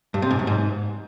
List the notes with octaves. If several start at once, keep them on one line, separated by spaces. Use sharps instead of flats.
G2
C3
G#2
F#2
G#2